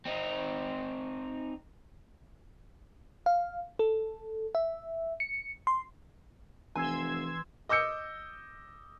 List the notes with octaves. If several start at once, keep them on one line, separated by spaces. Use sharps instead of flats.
C4 D#4
F5
A4
E5
C#7
C6
F1 E3 G#5 C6 E6 G#6
D#5 D6 E6 G6 C#7